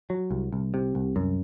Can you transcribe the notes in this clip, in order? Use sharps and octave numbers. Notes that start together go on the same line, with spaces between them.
F#3
C2
C2
C3
C2
F#2